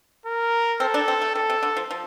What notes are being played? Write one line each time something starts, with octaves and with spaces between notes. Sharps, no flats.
A#4
C4 A4
D4
C4
A3
G3 A4
C3
D3
F3
F3